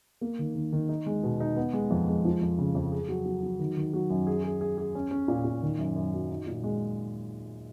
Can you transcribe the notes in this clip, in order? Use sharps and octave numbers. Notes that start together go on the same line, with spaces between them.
A#3
D#3
D#3
D#3
D#4
G#3
B2
D#4
B3
G#3
F2
G#3
F3
F2
C#3
F2
G#4
F#3
F#3
F#3
D#3
D#3
F#3
F#2
G#4
G#4
G#4
G#4
C#4
C#4
A#2
A#2
D#3
F#2
F#2
F#3
D#4
A#2
G#3